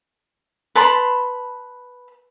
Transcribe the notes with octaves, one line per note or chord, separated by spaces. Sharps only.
B4 A5 B5 C6